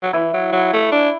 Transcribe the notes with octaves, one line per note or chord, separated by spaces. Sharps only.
F#3
E3 E4
F#3
F#3
A3
D4